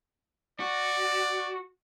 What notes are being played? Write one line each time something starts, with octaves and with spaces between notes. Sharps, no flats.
F#4 D5